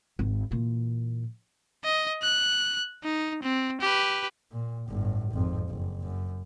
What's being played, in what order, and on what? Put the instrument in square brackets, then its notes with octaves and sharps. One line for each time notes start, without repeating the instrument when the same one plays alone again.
[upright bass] G#1
A#2 E3
[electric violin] D#5
F#6
D#4
C4
G4 B4
[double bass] A#2
G1 A2
G#1 F2
F#1
F#2